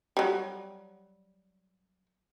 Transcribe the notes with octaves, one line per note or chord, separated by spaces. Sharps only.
F#3 G3